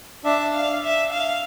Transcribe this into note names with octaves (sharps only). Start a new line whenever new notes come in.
D4 E5
F5
E5
F5